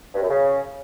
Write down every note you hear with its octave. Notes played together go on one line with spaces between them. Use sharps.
G2
F#2
C#3